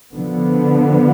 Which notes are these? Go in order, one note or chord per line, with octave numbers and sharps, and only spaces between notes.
D3 F3 B3